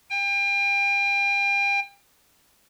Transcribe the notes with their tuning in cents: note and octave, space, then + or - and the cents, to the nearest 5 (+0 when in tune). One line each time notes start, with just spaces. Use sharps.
G5 +35